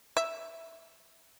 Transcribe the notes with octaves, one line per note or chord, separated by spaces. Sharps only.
E5